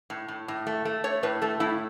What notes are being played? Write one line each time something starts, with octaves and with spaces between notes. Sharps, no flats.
A2
A2
A2
A3
A3
A3 C#5
A2 B4
A3 A4
A2 E4